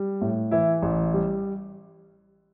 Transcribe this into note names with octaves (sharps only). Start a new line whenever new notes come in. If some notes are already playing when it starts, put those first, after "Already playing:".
Already playing: G3
A2
E3 E4
A1
G3